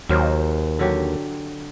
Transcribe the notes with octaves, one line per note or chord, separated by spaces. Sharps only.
D#2 F#3 A#4 C5
D3 F#3 G4